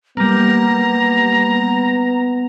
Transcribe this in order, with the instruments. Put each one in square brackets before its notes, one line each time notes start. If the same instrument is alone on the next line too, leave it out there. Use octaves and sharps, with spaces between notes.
[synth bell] G3 A#3 [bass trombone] B3 [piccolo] A#5